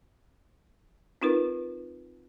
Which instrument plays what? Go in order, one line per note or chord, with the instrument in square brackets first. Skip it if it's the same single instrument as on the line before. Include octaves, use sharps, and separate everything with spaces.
[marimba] C4 D#4 F4 A#4 B4